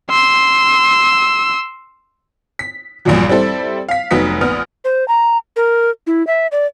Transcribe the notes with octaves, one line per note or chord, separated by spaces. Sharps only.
C6 E6
B6
A#1 E2 G2 A#2 F3 F#3
G3 C4 E4 A4 C5
F5 B6
F1 F#3 B3 D#4 B6
A#1 B3 D#6 F6
C5
A#5
A#4
E4
E5
D5